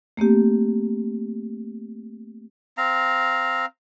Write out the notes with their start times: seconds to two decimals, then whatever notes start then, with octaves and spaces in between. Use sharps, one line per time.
0.17 A3 A#3 C4 G4
2.78 C4 F5 A#5